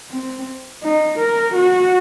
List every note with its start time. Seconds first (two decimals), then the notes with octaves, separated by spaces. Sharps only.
0.11 C4
0.83 D#4
1.19 A#4
1.55 F#4